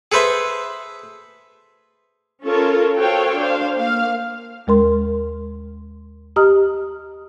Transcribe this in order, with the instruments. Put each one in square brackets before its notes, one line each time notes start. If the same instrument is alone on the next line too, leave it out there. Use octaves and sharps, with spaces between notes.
[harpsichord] G#4 A4 B4 C5 E5
[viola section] C#4 F4 A4 A#4 C#5
F#4 A4 C5 C#5 F5 G5
D4 C5 F5
A#3 F5
[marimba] D#2 G#3 A#4 C6
G4 D#5 A#5 D#6 F6